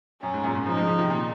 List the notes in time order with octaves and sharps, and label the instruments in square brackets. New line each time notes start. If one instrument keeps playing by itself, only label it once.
[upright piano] F#2 [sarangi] C#4
[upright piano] G#2
F#2 A#2
G#2
[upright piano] C#3 F3 [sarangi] D#4
[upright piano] F3 G#3
C#3 F3
C3 D#3
A#2 C#3